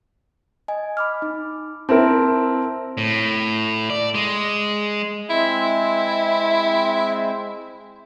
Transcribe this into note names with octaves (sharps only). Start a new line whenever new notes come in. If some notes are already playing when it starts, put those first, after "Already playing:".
D#5 G#5
B5 D6 F6
D#4
C4 E4 A#4 A5
A2
D5
G#3
G#3 C4 E4